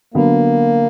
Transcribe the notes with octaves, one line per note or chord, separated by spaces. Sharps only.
D3 F#3 A#3 B3